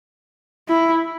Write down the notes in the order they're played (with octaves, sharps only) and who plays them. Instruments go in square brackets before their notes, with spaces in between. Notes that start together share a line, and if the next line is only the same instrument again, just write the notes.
[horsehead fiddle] E4